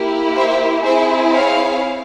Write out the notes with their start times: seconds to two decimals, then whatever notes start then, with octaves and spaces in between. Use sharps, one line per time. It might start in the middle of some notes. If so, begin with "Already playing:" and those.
Already playing: A#3 E4 G4
0.36 C5 E5
0.84 C4 E4 G#4 C5 E5
1.32 C#5 F5